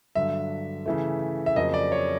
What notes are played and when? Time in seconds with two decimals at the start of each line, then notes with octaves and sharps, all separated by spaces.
0.15 G2 D3 F#3 E5
0.86 C#3 E3 A3
1.46 E5
1.56 F2 C#3 F#3 A#3 D#5
1.74 D5
1.92 C#5